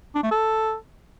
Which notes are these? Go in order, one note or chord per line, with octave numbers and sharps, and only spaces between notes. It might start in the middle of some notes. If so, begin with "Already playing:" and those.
D4
A3
A4